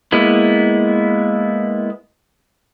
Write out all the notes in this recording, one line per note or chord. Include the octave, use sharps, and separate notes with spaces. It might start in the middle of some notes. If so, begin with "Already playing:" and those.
G#3 A#3 B3 E4